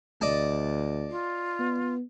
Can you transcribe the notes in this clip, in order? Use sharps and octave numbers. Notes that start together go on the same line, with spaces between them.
D2 D5 D#5 A5
F4
B3